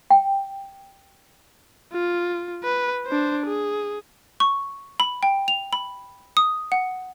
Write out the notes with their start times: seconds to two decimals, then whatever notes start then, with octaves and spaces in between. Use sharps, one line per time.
0.11 G5
1.93 F4
2.64 B4
3.06 D4 C5
3.47 G#4
4.40 C#6
5.00 B5
5.23 G5
5.48 F7
5.73 B5
6.37 D#6
6.72 F#5